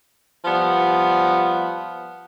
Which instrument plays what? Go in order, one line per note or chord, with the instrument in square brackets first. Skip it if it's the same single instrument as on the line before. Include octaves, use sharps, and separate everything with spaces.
[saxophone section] F3 G3 B3